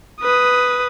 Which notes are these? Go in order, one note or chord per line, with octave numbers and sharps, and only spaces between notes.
B4 D#6